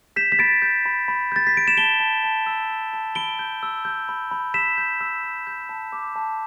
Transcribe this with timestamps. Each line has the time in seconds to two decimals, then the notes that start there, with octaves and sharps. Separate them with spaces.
0.16 G6 B6 E7
0.32 B6
0.39 B5 A6 D7
0.62 G6
0.85 B5
1.08 B5
1.32 G6 A6
1.47 B6
1.54 G6 D7
1.68 E7
1.77 A5 D7 G7
2.00 A5
2.24 A5
2.46 E6
2.70 E6
2.93 A5
3.15 B5 D7 G7
3.39 G6
3.63 E6
3.85 G6
4.09 B5
4.31 B5
4.54 E6 B6 E7
4.78 G6
5.01 E6
5.24 E6
5.47 G6
5.69 A5
5.92 D6
6.16 A5